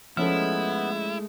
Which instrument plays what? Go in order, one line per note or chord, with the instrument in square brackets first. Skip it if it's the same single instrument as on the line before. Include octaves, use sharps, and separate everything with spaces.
[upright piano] F3 C#4 A4 [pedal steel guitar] G#3 A3 F6 [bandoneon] B3 [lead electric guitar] E4